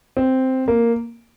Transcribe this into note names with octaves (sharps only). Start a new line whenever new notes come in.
C4
A#3